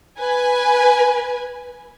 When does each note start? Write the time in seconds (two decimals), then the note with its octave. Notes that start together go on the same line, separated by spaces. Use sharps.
0.18 B4 G#5